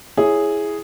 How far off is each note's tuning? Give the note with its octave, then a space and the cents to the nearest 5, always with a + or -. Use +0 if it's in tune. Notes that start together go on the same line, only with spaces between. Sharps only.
E4 +0 G#4 +0 C#5 +0